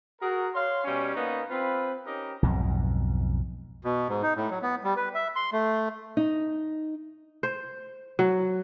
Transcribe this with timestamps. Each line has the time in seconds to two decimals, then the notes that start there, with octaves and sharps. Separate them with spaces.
0.20 F#4 G#4 A#4
0.54 C#5 F5 C6
0.85 B2 G3 C#4
1.15 A#3 B3 C#4 D#4
1.49 C4 F4 B4
2.06 C#4 D#4 G4 A#4
2.43 B1 F2 G#2 B2
3.85 B2
4.09 G#2
4.22 D#4
4.36 A2
4.51 F#3
4.62 B3
4.84 G3
4.97 B4
5.14 E5
5.36 C6
5.53 A3
6.17 D#4
7.43 C5
8.19 F#3